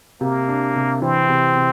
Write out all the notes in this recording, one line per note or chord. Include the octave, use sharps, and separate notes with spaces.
C3 A#3
D4
C3
E3 C4
C3
C3